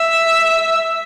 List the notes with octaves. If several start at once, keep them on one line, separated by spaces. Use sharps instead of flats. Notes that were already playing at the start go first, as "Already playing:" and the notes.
Already playing: E5